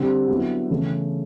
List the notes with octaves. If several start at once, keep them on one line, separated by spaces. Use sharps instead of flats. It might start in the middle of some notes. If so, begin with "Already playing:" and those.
Already playing: D3 G3 C4
D3 F#3 B3 E4
C#3 E3 A3 C#4